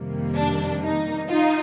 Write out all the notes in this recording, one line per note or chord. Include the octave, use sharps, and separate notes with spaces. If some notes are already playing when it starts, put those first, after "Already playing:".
Already playing: F2 C3 D#3 G3 A#3
D4
D#4
D#4 F4